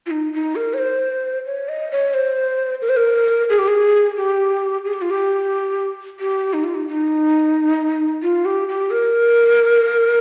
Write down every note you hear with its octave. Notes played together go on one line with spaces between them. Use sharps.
F4
D#4
D#4
A#4
C#5
C5
C#5
D#5
C#5
C5
A#4
C5
A#4
G#4
G4
G#4
G4
G#4
G4
F4
G4
G4
D#4
F4
D#4
D#4
F4
G4
G4
A#4